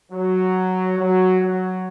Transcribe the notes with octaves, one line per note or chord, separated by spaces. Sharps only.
F#3
F#3
F#3